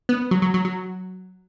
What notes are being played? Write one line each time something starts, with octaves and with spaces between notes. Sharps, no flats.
B3
F#3
F#3
F#3
F#3